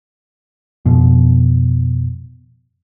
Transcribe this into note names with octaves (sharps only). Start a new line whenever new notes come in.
F2 B2